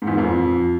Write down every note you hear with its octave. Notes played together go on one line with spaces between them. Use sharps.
G#2
E2
A#2
F2